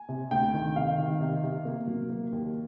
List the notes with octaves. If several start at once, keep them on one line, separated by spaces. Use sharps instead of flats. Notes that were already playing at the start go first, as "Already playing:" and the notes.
Already playing: G#5
C3
D2 G5
D#3
C3 F5
D#3
C3
C3
A#3
F#3
A#3
D#2